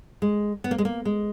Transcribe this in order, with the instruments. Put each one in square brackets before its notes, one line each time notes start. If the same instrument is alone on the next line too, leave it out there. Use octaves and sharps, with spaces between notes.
[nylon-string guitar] G#3
B3
A#3
G#3
A#3
G#3